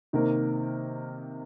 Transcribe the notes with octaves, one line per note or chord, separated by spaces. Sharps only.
C3 D#3 A#3 D#4 A#4